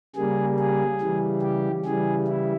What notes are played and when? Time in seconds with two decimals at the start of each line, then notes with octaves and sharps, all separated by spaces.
0.15 C#3 G3 A#3 G#4
0.59 G#4
1.01 C#3 E3 G3
1.42 G4
1.85 C#3 E3 G3 G#4
2.28 E4